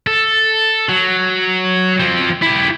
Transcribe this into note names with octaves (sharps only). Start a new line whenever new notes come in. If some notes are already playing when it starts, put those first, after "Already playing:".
A4
F#3
F3 C4
E4 G4